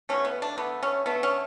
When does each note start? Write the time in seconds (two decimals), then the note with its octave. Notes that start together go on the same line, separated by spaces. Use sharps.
0.09 B2 A3 C#4
0.25 B3
0.42 D4
0.58 D3 A3 B3
0.83 C#4
1.06 D3 A3 B3
1.23 C#4